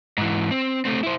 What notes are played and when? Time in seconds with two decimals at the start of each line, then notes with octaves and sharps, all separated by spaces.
0.18 G#2 E3
0.51 C4
0.85 A3 C4
1.03 E4 C5